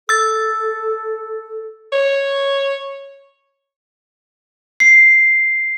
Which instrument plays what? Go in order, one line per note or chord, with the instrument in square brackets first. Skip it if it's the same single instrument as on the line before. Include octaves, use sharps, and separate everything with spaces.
[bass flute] A4 [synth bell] E6 A6
[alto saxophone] C#5
[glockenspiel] C7